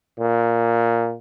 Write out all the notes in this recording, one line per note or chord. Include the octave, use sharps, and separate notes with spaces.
A#2